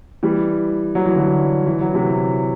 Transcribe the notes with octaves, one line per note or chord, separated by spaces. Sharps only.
E3 G3
F#3
E3
D3 F#3
E3
F#3
C3 E3